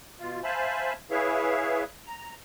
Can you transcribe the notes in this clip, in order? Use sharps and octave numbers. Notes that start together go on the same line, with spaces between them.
B2 F4
C5 E5 F5 G#5 A5 B5
E4 G#4 B4 C#5 E5 F5
A#5